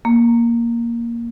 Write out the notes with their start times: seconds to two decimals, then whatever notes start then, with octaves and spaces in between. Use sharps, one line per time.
0.05 A#3